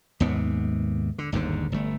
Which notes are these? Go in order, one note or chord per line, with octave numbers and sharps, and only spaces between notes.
D#2 G#2 C3 B3
D3
G1 D#2 G#2 D3
G1 A3